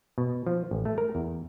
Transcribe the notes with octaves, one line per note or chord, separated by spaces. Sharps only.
B2
F3
A1
A3
A#4
E2